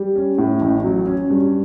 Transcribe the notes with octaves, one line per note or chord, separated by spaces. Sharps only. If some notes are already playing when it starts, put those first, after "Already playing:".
Already playing: G3
C#4
A2
A1
F#3
C#4
G2